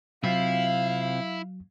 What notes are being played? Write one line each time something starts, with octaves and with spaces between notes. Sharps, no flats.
C3 F#3 C4 E4 F4 F5